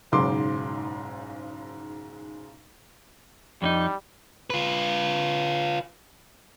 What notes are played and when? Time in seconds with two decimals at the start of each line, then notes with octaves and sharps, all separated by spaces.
0.12 F#1 B1 G#2 C#3 C6 D6
3.62 F2 G3 C#4 D#4
4.50 F4 B4